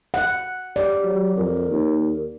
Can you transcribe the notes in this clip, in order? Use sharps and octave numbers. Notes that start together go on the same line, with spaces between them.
F#5
G4 D5
F#3
F2 A#4
D#2